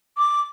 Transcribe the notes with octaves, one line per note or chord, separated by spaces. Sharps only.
D6